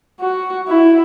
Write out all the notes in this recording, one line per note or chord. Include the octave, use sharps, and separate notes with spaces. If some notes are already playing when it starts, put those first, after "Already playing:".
F#4
E4